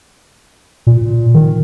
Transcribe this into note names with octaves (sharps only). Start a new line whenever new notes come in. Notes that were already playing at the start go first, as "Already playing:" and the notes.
A#2
D#3